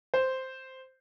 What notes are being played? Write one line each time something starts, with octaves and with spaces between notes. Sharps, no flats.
C5